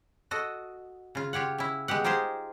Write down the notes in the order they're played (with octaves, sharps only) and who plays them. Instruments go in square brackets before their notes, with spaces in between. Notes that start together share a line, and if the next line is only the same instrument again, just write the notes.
[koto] F#4 A4 D#5
C#3 F4
F4 G4 C#5 F#5
C#4 E4
G#3 B3 G4 F#5
D#4 F4 G4 G#4 C5